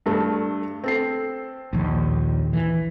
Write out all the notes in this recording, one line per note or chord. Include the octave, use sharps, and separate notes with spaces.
G2 A3
C4 A4 C7
A#1 D#2
E3